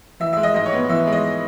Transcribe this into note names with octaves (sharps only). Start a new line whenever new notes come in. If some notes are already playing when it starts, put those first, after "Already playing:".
E3 E5
G#3 E5
D#5
G#2 D#5
C#5
B3
E3 E5
G#3
D#5